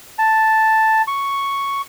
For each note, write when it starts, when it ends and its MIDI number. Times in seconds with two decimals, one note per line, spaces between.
0.19 1.02 81
1.08 1.82 85